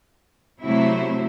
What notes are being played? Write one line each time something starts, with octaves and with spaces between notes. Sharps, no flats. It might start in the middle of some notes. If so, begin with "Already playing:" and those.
C3 F#3 A3 C4 E4